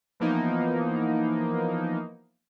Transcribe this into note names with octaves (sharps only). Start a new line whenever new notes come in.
E3 F3 A#3 B3 D#4